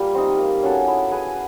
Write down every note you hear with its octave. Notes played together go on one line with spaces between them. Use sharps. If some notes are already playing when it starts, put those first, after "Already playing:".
Already playing: G3 A#3 F4 G4 A#4
C4 D#4
A#3
C#4 F#4 A4
E4
G#4 B4